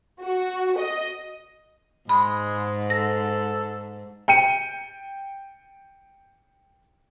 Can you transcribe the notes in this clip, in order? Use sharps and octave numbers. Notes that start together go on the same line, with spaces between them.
F#4
D#5
G#2 G#3 B5
A4 A#6
G5 C#7 D#7